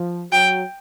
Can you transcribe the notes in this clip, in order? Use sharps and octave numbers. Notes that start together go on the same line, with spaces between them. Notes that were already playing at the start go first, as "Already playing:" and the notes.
Already playing: F3
F#3 G5